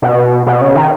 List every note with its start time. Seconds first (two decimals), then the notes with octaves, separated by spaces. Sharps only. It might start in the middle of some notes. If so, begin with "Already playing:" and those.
0.02 B2
0.46 B2
0.61 C#3
0.76 D#3